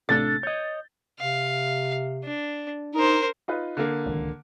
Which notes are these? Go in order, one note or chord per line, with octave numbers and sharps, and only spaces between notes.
A1 C3 A3 D4 A4 A6
C#5 D#5 G6
C3 F5
D4
D#4 A#4 C5
D#4 F4 B4
D3 A#3
D1 C#2 D#3